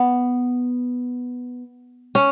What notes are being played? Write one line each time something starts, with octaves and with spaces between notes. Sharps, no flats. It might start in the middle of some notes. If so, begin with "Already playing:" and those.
Already playing: B3
C#4